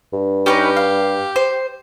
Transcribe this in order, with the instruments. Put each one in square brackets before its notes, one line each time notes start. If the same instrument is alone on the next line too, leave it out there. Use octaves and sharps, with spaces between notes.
[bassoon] G2
[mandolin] C#4 D#4 B4 [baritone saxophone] G4
[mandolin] F5
C5